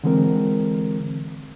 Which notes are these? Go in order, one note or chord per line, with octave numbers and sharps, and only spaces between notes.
D3 E3 G#3 C4 A#4